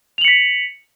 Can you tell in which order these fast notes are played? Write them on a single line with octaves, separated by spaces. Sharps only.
F7 F#7 C#7 B6